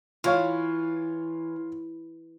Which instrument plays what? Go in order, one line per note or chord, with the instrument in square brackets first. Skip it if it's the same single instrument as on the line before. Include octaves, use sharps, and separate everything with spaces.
[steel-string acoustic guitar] E3 [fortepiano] F4 C#5 F5